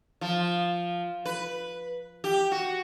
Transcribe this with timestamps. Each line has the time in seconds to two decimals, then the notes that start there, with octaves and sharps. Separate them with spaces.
0.21 F3
1.25 B4
2.24 G4
2.52 F#4